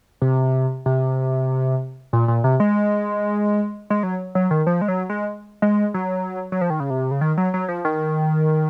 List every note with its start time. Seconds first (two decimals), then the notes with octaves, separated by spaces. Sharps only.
0.22 C3
0.86 C3
2.13 A#2
2.28 A#2
2.44 C3
2.60 G#3
3.90 G#3
4.03 F#3
4.35 F#3
4.51 D#3
4.67 F3
4.81 G#3
4.88 F#3
5.10 G#3
5.62 G#3
5.94 F#3
6.52 F#3
6.61 F3
6.70 D#3
6.80 C#3
6.90 C3
7.11 C#3
7.21 D#3
7.37 F#3
7.54 F#3
7.68 F3
7.85 D#3